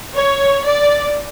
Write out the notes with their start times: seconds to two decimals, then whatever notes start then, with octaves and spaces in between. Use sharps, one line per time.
0.15 C#5
0.66 D5